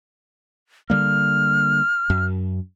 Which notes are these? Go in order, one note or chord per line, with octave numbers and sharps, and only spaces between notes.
D3 G3 A#3 F6
F#2